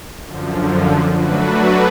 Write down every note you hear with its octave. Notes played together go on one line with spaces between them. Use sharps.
F#2 D3 F3
F#3 A3 D4 F#4 B4